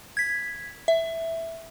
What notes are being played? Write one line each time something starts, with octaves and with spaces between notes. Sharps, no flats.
G#6 B6
E5